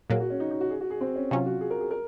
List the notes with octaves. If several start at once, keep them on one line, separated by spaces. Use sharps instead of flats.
A#2 F#3 A#3 G#4
F#4
C#4
D#4
D#4
F#4
G#4
F#4
G#4
C4
C#4
C3 F#3 C#4 F4
F#4
G#4
A#4
G#4
A#4